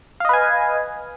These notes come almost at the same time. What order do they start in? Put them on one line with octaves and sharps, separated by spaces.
F5 D#5 B4 G#5